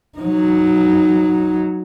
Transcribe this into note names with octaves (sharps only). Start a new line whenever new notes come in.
F#3 D#4